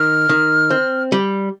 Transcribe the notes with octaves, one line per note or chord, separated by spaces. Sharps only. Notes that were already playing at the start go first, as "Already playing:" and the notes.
Already playing: D#3 F6
D#3
C4
G3